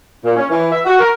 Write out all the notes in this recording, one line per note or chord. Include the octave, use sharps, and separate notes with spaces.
A#2
C#4
E3
E5
F#4
A#4